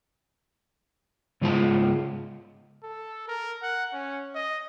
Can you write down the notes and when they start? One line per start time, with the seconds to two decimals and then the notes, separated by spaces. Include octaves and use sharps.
1.41 G#2 C#3 G#3 F4 G4 A5
2.83 A4
3.28 A#4
3.62 F#5
3.93 C#4
4.35 D#5